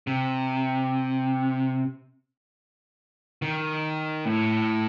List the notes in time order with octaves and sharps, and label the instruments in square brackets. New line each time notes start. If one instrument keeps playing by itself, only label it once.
[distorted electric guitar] C3
D#3
A2